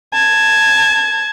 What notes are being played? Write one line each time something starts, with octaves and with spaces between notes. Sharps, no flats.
A5 G#6